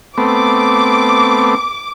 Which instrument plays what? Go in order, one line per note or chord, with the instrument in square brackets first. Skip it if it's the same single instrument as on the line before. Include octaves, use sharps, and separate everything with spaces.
[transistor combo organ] A3 B3 C4 [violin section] D6